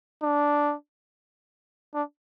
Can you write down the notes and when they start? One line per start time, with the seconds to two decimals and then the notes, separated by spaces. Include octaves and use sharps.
0.23 D4
1.94 D4